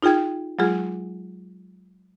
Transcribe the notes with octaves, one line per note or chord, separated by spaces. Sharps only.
D#4 F4 G#4 G5 G#6
F#3 G#3 F4 G#4